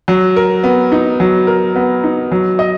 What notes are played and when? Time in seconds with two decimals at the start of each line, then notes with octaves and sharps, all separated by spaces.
0.08 F#3
0.36 A#4
0.63 B3
0.92 D#4
1.20 F#3
1.47 A#4
1.76 B3
2.04 D#4
2.32 F#3
2.59 D#5